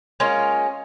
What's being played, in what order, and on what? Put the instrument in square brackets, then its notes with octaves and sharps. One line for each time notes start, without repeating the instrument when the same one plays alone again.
[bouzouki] G#3 A#3 C#4 F4